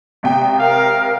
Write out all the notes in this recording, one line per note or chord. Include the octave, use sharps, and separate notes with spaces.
G#1 C3 G5
A#4 F5